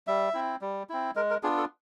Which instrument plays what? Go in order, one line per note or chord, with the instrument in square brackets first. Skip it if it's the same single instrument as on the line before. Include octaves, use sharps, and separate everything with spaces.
[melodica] G3 E5
C4 E4
G3
C4 E4
G#3 A#4
A#4
B3 D4 F4 G#4
A4